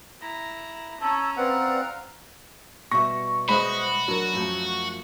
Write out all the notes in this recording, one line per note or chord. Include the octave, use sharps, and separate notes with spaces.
E4 A#5
C#4 C#5 A5 A#5 E6
C4 B4 D5 F5 F#5
B2 G3 E5 C#6 A#6
G#3 F#4 C5 D#5 B5
F#3 D4 A#4
F#2 F3 A3